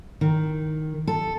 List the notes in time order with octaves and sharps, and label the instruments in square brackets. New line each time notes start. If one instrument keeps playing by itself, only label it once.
[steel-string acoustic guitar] D#3
A4